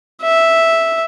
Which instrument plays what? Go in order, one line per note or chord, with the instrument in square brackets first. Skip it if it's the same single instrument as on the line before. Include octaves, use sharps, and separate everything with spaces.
[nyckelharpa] E5